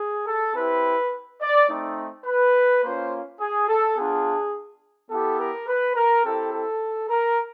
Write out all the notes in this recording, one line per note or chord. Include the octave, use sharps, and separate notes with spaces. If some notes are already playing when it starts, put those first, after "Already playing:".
Already playing: G#4
A4
C4 E4 G4 B4
D5
A3 C4 D#4
B4
A#3 C#4 F4 C5
G#4
A4
B3 D4 F4 G#4
B3 E4 G4 A4
A#4
B4
A#4
C4 E4 G4 A4
A4
A#4